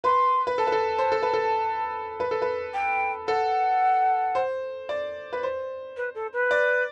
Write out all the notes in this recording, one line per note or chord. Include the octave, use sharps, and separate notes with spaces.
B4 C6
B4
A4 A5
B4
A4
C5
A4
B4
A4
B4
A4
B4
G5
A4 F#5
C5
D5
B4
C5
B4
A4
B4
D5